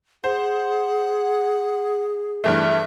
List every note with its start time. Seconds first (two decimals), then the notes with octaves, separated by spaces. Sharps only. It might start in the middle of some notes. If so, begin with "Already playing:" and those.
0.24 G#4 C5 F#5
2.44 G2 E3 A3 E5